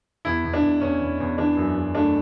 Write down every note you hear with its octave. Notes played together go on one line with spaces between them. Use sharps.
E2 E4
E2
D4
E2
E2 C#4
E2
E2
E3 D4
F#2
F#2
A3 D4